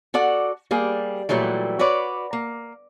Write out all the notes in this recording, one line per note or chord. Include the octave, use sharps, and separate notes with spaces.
F#4 A4 D5 F#5
G3 A#3 G#4
A#2 E3 F#3 G3 A3
F#4 B4 C#5 D5
A#3